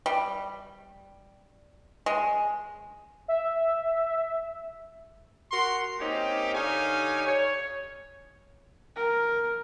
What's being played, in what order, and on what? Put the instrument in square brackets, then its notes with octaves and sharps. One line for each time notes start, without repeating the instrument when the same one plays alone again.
[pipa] G3
G#3
[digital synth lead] E5
[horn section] F#4 A#4 C6
A#3 C4 C#4 D#4 G4
D3 D#4 G4 C#5 F5 G#5
C#5
[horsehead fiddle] A#4